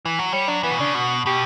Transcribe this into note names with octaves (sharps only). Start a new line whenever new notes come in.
E3
F#3
G3 C#5
F#3 D4
E3 B3
B2
C#3 D4
B2 F#4
B2 G4